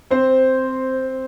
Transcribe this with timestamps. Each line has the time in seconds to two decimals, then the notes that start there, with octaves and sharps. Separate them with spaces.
0.10 C4 C5